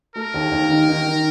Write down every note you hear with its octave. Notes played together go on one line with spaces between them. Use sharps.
A3 A#4
D#2
D#2
D#3
D#3
D#3